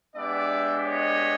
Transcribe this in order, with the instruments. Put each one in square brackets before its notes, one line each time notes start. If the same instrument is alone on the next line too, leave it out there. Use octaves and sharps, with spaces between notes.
[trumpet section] G#3 B3 D4 G4 D5 E5
C#5 D#5